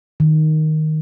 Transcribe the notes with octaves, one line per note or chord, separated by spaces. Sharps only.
D#3